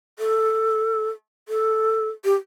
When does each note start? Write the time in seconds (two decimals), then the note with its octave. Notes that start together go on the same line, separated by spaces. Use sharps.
0.19 A4
1.48 A4
2.25 G4